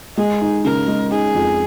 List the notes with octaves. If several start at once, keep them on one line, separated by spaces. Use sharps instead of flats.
G#3 G#4
D#4
C#3 A#4
G#3
D#4 G#4
F2